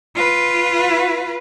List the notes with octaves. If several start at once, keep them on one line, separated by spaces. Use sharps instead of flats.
F4 B4